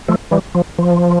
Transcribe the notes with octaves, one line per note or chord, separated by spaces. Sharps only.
F3 A3
E3 G3
F3
F3